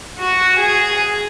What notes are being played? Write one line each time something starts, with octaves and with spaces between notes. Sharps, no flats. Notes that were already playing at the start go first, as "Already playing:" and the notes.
F#4
G#4